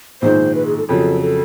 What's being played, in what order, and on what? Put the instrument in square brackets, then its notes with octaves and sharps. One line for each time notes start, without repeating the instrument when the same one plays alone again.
[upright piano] A#1 G#2 D#3 G#3 [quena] C5
[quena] B4
G#4
A4
[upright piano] F2 C#3 F#3 [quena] A4
[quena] A4